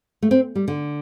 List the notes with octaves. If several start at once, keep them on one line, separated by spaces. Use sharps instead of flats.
A3
C4
G3
D3